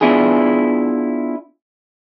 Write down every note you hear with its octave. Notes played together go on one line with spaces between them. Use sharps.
B3 D4 E4 F4 G#4